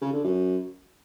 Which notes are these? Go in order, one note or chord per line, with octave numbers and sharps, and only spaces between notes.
C#3
D3
F#2